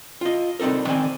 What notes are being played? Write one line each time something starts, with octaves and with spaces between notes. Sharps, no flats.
F4 D#5
C2 C4 D#4 A4 A#4
D#3 C4 D5 G#5